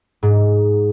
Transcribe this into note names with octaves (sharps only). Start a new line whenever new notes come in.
G#2